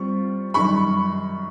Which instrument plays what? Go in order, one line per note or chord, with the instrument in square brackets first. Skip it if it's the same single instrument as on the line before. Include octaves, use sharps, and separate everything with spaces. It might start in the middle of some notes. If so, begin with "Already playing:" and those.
Already playing: [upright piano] G3 C4 F4 [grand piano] C#6
[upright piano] F#2 D#3 G3 [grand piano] B5 C#6